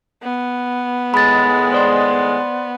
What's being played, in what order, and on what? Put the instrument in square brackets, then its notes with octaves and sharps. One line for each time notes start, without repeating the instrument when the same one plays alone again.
[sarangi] B3
[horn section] A2 D#3 G#3 [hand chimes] B5 A6
[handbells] C5 D5 C6